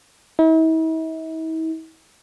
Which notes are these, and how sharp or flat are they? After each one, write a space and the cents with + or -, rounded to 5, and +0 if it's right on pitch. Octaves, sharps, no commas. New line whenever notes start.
E4 -45